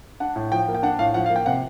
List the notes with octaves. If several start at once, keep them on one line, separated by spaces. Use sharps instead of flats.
D4 F#5
A2
F3 G5
A#3
G5
D4 F#5
A2 F5
F3 F#5
F5
A#3
G5
C3 F#5